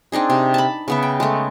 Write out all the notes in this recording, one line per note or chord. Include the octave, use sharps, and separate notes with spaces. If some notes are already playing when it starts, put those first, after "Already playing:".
C4 D4 D#4 G#4
C3
A5 B5
C#3 B3 E5
G5
G#3 A3